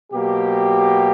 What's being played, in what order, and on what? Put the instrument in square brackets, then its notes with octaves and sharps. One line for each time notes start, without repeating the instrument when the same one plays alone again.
[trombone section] B2 F#3 A#3 G4